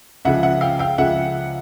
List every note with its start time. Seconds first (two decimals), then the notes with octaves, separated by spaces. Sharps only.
0.25 C#2 C#3 F3 E5 F#5
0.43 E5 F#5
0.61 F5 G5
0.79 F5 G5
0.98 C#2 C#3 F3 E5 F#5